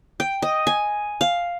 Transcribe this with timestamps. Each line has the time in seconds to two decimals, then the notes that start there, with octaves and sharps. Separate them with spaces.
0.20 G5
0.42 D#5
0.67 G#5
1.21 F5